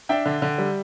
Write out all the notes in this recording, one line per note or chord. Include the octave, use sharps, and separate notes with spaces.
D4 E5 G5
D3
D3
G3